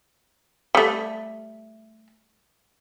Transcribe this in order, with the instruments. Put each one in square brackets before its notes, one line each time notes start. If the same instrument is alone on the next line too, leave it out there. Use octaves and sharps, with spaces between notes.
[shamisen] G3 A3